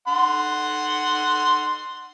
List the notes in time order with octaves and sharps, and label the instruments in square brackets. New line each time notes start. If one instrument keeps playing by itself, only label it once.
[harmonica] F#5 C6